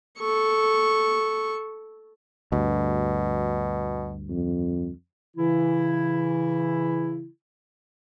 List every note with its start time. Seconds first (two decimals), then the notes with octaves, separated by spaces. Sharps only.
0.19 A4 C#6
2.52 D2 G2 B2
4.29 F2
5.36 C#3 E3 E4